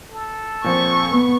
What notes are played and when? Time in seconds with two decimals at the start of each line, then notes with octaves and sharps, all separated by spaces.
0.11 A4
0.64 A#2 F3 C4 C#6
1.08 B3